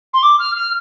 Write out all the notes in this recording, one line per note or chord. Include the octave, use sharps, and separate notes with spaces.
C6
D6
F6
F6